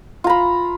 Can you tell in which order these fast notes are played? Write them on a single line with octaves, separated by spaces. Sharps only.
F4 A#5 B5